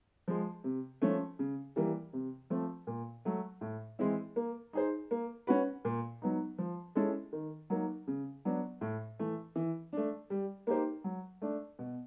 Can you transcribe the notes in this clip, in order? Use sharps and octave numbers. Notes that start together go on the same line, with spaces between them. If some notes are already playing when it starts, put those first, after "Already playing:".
F3 G#3
C3
F3 A3 C#4
C#3
E3 G3 A#3
C3
F3 A3 C4
A#2
F#3 A3
A2
E3 G#3 C4 E4
A#3
D#4 G#4 C5
A#3
C#4 F#4 B4
A#2
F#3 B3 D#4
F3
G#3 C#4 E4 A4
D#3
F#3 A#3 D#4
C#3
F#3 B3 D4
A2
E3 A3
E3
A3 D4
G3
A#3 D#4 G4 C5
F#3
A3 D4
B2